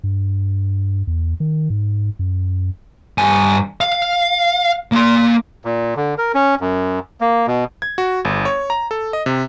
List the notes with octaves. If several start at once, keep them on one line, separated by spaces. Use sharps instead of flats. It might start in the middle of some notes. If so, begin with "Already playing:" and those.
G2
E2
D#3
G#2
F#2
G2 G#5
F5
A#3 C6
A#2
D3
A#4
C#4
F#2
A#3
B2
G#6
F#4
G1
C#5
A#5
A4
D#5
C3